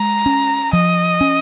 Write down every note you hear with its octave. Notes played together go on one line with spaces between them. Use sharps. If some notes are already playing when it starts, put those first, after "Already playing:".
Already playing: G#3 A#5
C#4
F3 D#5
C#4